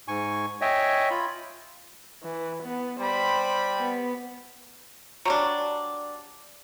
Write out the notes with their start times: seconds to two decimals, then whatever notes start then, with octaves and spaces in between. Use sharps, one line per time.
0.08 G#2 G#5 C#6
0.61 C#5 D#5 E5 G5 G#5
1.11 F4 B5
2.23 E3
2.63 B3
3.00 G3 C5 G5 B5
3.79 B3
5.25 F#3 G3 D4